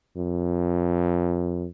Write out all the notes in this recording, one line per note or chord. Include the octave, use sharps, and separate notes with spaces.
F2